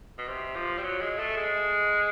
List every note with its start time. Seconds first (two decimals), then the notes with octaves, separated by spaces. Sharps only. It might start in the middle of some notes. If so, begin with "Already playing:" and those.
0.18 B2
0.28 C3
0.55 F3
0.78 G3
0.83 F#3
1.01 G#3
1.19 A3
1.37 G#3